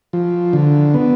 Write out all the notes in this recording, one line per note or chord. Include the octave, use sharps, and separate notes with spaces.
F3
D3
B3